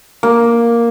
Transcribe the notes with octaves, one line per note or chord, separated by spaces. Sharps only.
A#3